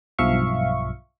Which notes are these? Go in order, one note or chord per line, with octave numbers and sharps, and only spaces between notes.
B1 G2 F3 E5 F5 C#6